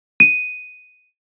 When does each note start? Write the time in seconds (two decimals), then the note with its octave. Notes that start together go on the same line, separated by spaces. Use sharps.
0.20 D#7